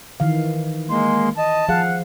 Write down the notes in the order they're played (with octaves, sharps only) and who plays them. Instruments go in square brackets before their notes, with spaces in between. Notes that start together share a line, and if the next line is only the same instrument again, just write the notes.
[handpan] D#3 E3 F5
[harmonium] G#3 A#3 [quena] C6
[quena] D#5 [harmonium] A5
[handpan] F3 G#4 F5 [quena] F#5